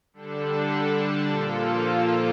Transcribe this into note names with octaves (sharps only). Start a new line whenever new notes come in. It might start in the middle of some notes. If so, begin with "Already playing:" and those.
D3 G3 D4 A4
A#2 F3 A#3 F4 A4